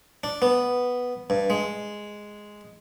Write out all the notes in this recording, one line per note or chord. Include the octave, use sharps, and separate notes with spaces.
D4
B3
G2
G#3